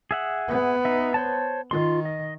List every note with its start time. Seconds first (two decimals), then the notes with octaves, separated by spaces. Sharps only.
0.11 G#4 E5 F#5
0.48 B3
0.85 D#4 E5
1.14 C5 C#5 A5
1.71 D#3 F4 C6
2.05 D#5